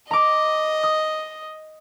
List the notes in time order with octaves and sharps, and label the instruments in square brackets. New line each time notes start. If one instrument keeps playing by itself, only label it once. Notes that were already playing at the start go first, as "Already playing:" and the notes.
[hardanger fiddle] D#5 [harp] A#5 D6
[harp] D#6